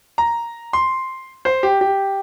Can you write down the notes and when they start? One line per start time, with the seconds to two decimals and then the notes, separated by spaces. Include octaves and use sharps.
0.18 A#5
0.73 C6
1.45 C5
1.63 G4
1.81 G4